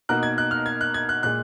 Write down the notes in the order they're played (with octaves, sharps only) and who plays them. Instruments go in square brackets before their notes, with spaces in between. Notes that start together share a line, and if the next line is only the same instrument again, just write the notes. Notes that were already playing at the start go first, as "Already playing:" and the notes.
[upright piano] B2 A#3 D#4 F#4 A#4 [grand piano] F#6
[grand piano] G#6
F#6
F6
G#6
F#6
G#6
F#6
[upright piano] A#2 G#3 [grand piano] F#6